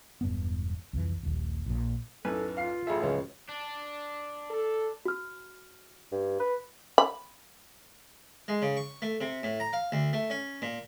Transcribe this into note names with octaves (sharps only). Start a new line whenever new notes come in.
E1 G2 B3
C2 F2 E3
D#1 A#1 D#2
A#1 A#2
B1 F#2 A2 A4 B4 G#5
F4 F5 C7
A1 G#4 A4 E5
C#2 F3 F#3 C#4
D4
A4
F#4 F6
G2
B4
B5
G#3
C#3
C#6
A3
C3
A2
A#5
F5
D2
A3
C#4
A#2